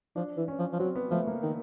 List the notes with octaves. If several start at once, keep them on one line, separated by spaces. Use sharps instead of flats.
F3 D4
E3
C#4
F3
F3
F#3 C4
B3
F3 A3
A#3
D#3